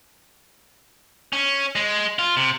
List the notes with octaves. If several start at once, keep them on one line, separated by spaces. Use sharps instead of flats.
C#4
G#3
F4
C3